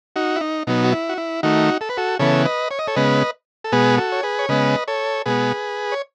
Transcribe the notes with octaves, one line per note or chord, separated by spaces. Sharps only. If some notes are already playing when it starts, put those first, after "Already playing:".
D#4 F#4
E4
D#4
B2 F#3 B3 D#4
F#4
E4
F#4
E4
D#3 A3 D#4 F#4
A4
B4
F#4 A4
C#3 E3 B3 A4 C#5
B4 D#5
C#5
D#5
A4 C#5
C#3 G#3 B3 B4 D#5
A4
B2 G#3 B3 G#4 B4
F#4 A4
C#5
G#4 B4
C#5
C#3 G#3 B3 B4 D#5
A4 C#5
B2 G#3 B3 G#4 B4
C#5